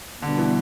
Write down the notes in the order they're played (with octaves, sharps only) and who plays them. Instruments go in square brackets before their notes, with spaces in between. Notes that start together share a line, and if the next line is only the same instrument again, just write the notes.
[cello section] B2 G3 D4 [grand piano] D3
[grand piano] E3